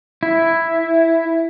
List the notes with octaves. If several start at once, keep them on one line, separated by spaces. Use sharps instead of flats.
E4